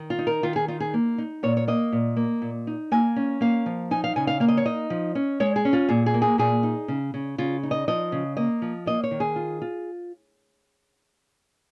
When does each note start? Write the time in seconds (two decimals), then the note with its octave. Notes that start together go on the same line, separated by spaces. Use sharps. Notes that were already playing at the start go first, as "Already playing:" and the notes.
Already playing: D#3
0.10 F4
0.19 D#4
0.27 A#4
0.43 D#3 F4
0.56 G#4
0.68 D#4 F4
0.80 G#4
0.94 A#3
1.18 D#4
1.43 A#2 C#5
1.57 C#5
1.68 A#3 D#5
1.92 A#2
2.17 A#3
2.42 A#2
2.67 D#4
2.91 A#3 G#5
3.16 C#4
3.41 A#3 F5
3.66 F3
3.91 D#4 G#5
4.04 F5
4.16 C#3 G#5
4.27 F5
4.40 A#3 F5
4.48 D#5
4.57 C#5
4.66 D#4 D#5
4.90 F3
5.15 C#4
5.40 G#3 C#5
5.56 G#4
5.65 C#4
5.73 F4
5.89 A#2 G#4
6.06 G#4
6.14 A#3
6.22 G#4
6.38 A#2 G#4
6.63 D#4
6.88 C#3
7.14 C#3
7.38 C#3 F4
7.63 D#4
7.71 D#5
7.88 F3 D#5
8.12 C#3
8.37 A#3 D#5
8.62 F3
8.86 A#3 D#5
9.04 C#5
9.11 D#3
9.20 G#4
9.36 F4
9.62 F4